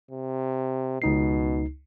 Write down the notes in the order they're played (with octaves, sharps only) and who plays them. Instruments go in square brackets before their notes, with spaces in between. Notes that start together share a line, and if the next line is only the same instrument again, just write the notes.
[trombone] C3
[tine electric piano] C#2 D#4 C7 [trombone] B2